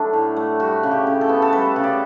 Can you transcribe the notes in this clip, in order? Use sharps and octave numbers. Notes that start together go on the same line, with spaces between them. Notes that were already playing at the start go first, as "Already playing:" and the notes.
Already playing: F#3 A3 D4 E4
A2
A3
G3 F#4
C#3
G4
C#3
A4
B3
A4
G3 B4
C#3
D5